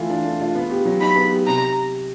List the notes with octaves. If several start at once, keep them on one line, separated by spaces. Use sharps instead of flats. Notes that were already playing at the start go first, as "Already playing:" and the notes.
Already playing: E3 A3 F4
D4
A3
F4
B3
G4
F#3
D#4 B5
B3
G4
C3 A#5